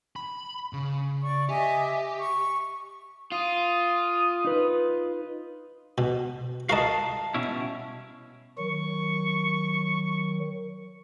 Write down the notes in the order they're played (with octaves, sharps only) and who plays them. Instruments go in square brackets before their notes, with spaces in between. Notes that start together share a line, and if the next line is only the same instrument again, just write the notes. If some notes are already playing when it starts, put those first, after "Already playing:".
[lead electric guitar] B5
C#3
[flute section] D5 C#6
[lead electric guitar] G4 [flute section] D#5 E5 G#5
[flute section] C#6
[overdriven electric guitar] F4 [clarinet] D#6
[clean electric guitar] D#4 B4
[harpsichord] B2
[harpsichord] F#4 A#4 D#5 [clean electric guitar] F5 A5
[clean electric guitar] B2 C#4 E4
[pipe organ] D#3 F#3 [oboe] C#6